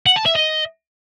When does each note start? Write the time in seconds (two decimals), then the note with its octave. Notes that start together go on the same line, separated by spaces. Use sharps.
0.06 F#5
0.16 A5
0.26 E5
0.35 D#5